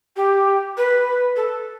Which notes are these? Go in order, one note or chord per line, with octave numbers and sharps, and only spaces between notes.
G4
B4
A4